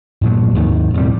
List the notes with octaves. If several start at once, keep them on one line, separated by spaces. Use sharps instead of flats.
G2 A#2 F3 F#3
D#2 G#2 D#3
E1 F2 A2 G3